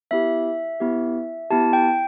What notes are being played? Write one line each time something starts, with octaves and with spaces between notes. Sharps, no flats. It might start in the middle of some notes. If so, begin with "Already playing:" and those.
B3 E4 G4 E5
B3 E4 G4
B3 E4 G4 A5
G5